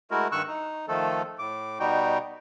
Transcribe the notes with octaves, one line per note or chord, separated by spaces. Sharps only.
G#3 A3 E4 F#4 A#4
G2 D#3 C#6 E6 F#6
D#4
D#3 F3 A3 A4
A2 D6
B2 G3 D#4 F#4 G5